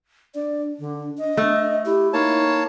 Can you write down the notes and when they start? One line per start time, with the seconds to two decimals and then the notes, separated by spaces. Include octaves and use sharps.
0.35 D4 D5
0.79 D3
1.18 D#5
1.37 A3
1.86 E4 G4
2.13 A#3 D#4 C#5 A5